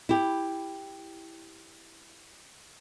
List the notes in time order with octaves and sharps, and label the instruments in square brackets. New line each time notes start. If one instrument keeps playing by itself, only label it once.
[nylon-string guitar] E4 G4